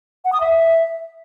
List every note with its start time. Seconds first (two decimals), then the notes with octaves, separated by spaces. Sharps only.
0.25 F#5
0.33 D#6
0.41 E5